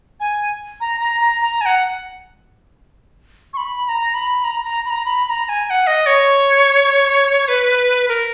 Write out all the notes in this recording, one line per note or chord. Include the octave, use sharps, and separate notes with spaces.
G#5
A#5
A#5
A#5
A#5
G#5
F#5
C#6
B5
B5
A#5
B5
A#5
A#5
B5
A#5
B5
B5
A#5
A#5
G#5
G#5
F#5
D#5
C#5
B4
A#4